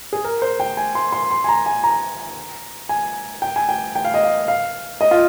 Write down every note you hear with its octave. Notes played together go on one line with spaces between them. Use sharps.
G#4
A#4
C5
G5
G#5
C6
C6
C6
G#5
A#5
G#5
A#5
G#5
G5
G#5
G5
G5
F5
D#5
F5
F5
D#5
F4